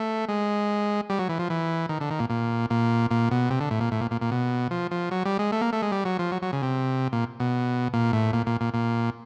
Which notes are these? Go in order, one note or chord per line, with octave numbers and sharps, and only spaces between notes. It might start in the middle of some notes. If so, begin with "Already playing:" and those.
Already playing: A3
G#3
G3
F#3
E3
F3
E3
D#3
D3
D#3
A#2
A#2
A#2
A#2
B2
C3
D3
A2
A#2
A2
A#2
A#2
A#2
B2
F3
F3
F#3
G3
G#3
A3
A#3
A3
G#3
G3
F#3
F3
F#3
F#3
C#3
C3
A#2
B2
A#2
A2
A#2
A#2
A#2
A#2